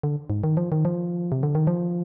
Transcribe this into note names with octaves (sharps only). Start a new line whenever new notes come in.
D3
G#2
D#3
F3
D#3
F3
C3
D3
D#3
F3